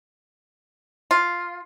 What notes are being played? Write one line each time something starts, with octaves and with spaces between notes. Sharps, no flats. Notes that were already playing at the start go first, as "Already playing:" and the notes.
F4